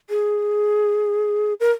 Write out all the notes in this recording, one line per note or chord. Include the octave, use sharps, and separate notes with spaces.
G#4
A#4